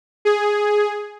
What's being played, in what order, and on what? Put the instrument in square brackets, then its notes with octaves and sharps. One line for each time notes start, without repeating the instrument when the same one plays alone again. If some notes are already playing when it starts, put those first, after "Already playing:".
[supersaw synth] G#4